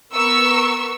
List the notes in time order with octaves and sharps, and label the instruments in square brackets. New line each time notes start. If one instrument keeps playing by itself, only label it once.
[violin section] B3 A#4 C#6 E6